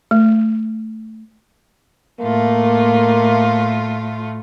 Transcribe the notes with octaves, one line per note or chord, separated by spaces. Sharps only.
A3
A2 A3 A#3 F4